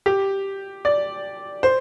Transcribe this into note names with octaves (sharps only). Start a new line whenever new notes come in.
G4
D5
C5